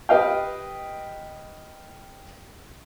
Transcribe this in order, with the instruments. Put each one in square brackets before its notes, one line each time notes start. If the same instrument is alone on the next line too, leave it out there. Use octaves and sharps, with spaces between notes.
[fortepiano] G4 B4 D#5 F5 G5